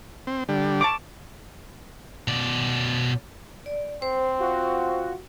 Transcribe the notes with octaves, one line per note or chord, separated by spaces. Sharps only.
C4
D3 G3
A5 C#6 D6
B2 D5
D5
C4 C5
F4 F#4